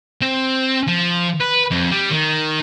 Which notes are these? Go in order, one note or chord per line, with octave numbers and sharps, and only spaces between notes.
C4
F3
B4
F2
G3
D#3